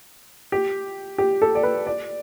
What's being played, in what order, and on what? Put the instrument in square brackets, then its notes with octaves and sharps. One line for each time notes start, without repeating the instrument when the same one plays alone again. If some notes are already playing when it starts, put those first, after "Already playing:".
[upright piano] G4
G4
A4
D5
B4
D5